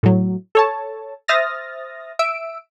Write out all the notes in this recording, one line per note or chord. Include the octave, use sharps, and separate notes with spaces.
A2 F#3
A4 C#5 A5
C5 E5 D#6 F6 A6 A#6
E5 E6 D7